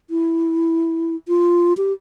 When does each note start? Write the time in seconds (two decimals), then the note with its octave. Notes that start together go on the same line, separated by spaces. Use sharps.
0.10 E4
1.28 F4
1.77 G4